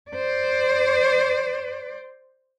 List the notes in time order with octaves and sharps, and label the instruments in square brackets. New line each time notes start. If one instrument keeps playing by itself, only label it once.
[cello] C5 D5